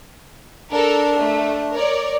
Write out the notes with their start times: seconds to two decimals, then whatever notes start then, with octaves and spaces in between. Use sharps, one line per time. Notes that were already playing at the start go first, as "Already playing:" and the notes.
0.72 D4 A4 A#4
1.19 A3
1.73 A#4 C#5 D5